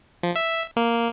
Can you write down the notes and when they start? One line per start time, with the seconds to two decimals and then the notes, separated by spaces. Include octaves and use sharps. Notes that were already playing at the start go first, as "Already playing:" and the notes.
0.23 F3
0.36 E5
0.77 A#3